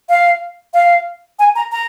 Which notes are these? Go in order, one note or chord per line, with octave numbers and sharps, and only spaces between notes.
F5
F5
G#5
A#5
A#5